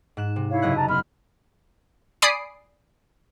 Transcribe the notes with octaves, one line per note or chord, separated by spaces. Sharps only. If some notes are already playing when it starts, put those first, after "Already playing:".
G#2 F#6 E7
C3
E4 C#5 F5
F#1 D#5 F#6
A5 A#5
B3 B5 C6 F6
D5 G#5 B5 D#6 C7 D7